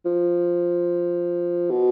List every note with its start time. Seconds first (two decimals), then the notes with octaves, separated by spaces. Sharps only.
0.06 F3
1.70 B2